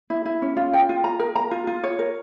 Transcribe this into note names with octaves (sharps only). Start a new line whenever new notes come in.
E4
E4
C#4
F4
G5
F4
A#5
A#4
A#5
F4
F4
C#5
A#4